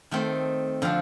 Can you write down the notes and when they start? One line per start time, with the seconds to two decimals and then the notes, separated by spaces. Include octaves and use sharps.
0.11 D#3 A3 C4
0.82 D3 F3 C4